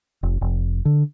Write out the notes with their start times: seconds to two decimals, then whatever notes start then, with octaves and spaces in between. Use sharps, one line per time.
0.23 F1
0.41 F1
0.85 D3